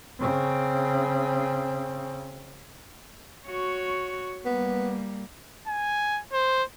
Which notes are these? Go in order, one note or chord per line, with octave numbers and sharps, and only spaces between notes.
C#3 C4
F#4 C#5
G3 A#3 B3
G#5
C5